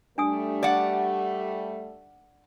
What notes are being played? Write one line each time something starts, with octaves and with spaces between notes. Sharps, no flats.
G3 A3 D4 G#5 D#6
D5 F#5